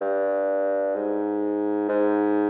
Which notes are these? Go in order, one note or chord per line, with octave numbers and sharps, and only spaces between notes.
G2
G#2
G#2